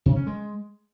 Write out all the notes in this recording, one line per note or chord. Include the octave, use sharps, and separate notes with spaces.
C3
C#4
G#3